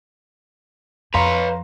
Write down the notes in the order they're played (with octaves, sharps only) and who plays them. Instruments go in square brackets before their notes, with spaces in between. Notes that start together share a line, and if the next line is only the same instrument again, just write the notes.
[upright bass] F2 [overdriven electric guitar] B4 C#5 [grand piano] F5 A#5 C6